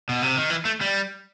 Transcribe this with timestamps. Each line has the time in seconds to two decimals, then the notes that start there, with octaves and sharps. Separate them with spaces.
0.09 B2
0.22 C3
0.37 D#3
0.50 E3
0.65 A3
0.81 G3